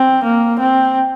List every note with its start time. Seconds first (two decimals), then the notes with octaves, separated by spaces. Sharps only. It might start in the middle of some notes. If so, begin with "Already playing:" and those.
Already playing: C4
0.24 A#3
0.59 C4